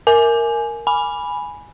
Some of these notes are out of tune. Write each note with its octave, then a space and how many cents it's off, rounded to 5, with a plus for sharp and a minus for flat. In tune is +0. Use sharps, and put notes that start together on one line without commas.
A#4 -5 G#5 +15
G#5 +0 B5 -5